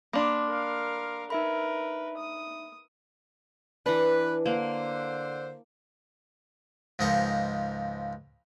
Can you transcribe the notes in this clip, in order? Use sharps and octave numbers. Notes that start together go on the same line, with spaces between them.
A#3 D4 B5 C6 D6
A#4 F5
D#4 A#4 B4 E5 B5
D#6
E3 D4 B4
D3 A#3 C5
C#2 G#2 F3 A#4 D#5 C#6